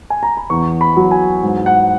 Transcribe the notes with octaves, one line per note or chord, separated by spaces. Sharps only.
G#5
A#5
B5
E2 C#6
B5
F#3
G#5
G#2
F#5